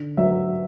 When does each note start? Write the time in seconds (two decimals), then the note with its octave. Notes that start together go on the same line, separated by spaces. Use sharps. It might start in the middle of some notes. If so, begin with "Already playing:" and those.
Already playing: D3
0.17 F#3 E5